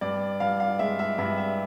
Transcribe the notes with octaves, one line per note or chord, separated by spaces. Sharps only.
G2 D5
G2 F5
F5
G#3 E5
E5
G2 E5
E5